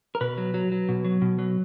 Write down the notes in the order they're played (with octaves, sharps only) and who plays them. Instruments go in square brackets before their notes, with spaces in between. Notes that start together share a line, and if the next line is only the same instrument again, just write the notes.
[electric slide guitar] A#4
B2 B4
F#3
F#3
F#3
B2
F#3
B2
F#3